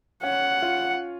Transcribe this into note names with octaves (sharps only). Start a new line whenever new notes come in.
C#4 F#5
F4